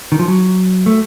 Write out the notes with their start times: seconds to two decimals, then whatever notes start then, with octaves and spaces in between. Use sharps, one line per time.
0.12 D#3
0.19 F3
0.28 F#3
0.86 A3